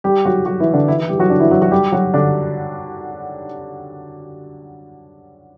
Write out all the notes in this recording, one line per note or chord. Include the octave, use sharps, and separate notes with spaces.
G3 G4
F#3 F#4
F#3 F#4
E3 E4
D3 D4
E3 E4
E3 E4
G3 G4
F#3 F#4
D3 D4
E3 E4
F#3 F#4
F#3 F#4
G3 G4
F#3 F#4
D3 D4